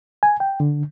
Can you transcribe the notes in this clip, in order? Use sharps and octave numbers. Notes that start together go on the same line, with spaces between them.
G#5
G5
D3